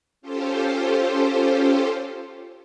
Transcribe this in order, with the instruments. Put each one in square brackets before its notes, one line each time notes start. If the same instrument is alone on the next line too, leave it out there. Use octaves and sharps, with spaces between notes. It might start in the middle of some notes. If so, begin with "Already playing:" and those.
[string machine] C#4 F4 G4 A4 C5